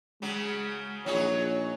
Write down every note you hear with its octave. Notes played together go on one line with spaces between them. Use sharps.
C#3 F#3 G#3
A#1 F#3 D#4 G#4 C#5